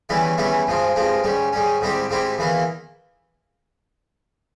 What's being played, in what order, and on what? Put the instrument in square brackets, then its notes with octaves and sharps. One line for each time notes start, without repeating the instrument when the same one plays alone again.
[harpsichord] E2 E3 G3 C#4 E4
E2 E3 G3 C#4 E4
G2 F3 G#3 C4
G2 F3 G#3 C4
G#2 G3 C#4
G#2 G3 C#4
G#2 G3 C4 E4 G4
G#2 G3 C4 E4 G4
E2 E3 A#3 E4